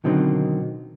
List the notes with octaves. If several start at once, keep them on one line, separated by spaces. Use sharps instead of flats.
B2 D3 D#3 F#3 C4 D#4